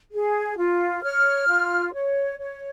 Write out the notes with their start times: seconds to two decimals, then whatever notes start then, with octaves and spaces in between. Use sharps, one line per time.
0.13 G#4
0.58 F4
1.03 C#5 F6
1.48 F4
1.94 C#5
2.39 C#5